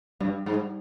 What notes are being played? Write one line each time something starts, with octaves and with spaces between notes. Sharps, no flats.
G2 G3
G#2